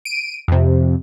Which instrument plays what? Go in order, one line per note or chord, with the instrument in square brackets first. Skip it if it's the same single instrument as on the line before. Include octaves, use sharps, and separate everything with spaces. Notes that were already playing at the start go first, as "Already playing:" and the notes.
[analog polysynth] D7 D#7
F2 C3